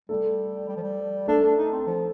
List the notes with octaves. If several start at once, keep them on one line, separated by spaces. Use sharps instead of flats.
G3 A3 A4
G3
F3
G3
A3 D4 A4
D4
D#4
C4
F3